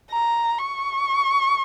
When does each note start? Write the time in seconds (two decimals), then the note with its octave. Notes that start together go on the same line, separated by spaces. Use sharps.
0.11 A#5
0.59 C#6